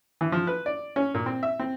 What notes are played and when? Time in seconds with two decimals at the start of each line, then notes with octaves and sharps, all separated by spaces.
0.21 E3
0.32 F3
0.47 B4
0.66 D5
0.96 C#4
1.14 A#2
1.26 C4
1.43 E5
1.60 C4